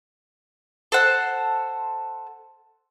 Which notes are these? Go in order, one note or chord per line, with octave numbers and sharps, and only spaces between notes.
A4 C5 F#5